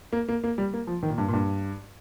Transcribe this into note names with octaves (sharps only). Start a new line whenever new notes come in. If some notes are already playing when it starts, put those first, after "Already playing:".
A#3
A#3
A#3
G3
A#3
F3
D#3
A#2
G2
A#2
G2